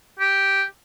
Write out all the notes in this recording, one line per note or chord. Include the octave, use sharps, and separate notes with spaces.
G4